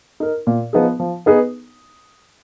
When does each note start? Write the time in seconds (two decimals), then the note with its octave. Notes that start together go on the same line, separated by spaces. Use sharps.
0.20 D#4 A#4
0.47 A#2
0.73 F3 B3 D#4 G#4
1.00 F3
1.26 B3 D#4 G#4 B4